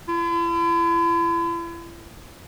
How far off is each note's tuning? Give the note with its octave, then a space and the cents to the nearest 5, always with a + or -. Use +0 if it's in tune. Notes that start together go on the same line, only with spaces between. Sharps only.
E4 +45